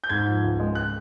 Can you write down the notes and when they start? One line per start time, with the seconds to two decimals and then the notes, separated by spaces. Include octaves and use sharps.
0.04 G6
0.09 G#2 G#6
0.26 F3
0.43 C#2
0.59 G#3
0.75 F#6